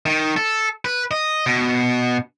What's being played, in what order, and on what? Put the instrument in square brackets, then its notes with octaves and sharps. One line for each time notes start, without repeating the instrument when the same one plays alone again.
[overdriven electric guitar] D#3
A4
B4
D#5
B2